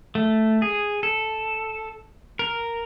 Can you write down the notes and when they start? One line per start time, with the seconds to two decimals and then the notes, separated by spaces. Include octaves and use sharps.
0.15 A3
0.62 G#4
1.03 A4
2.39 A#4